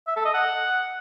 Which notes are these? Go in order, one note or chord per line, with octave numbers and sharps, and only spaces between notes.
E5
A4
D#5
F#5